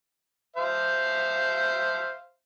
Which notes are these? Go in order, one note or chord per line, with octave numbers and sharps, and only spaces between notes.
C5 E5 F5